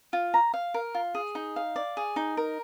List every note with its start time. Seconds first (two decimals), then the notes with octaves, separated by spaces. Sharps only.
0.13 F4
0.34 A#5
0.54 F5
0.74 A#4
0.95 F4
1.15 G#4
1.35 D#4
1.56 F5
1.76 D5
1.97 G#4
2.16 D#4
2.37 A#4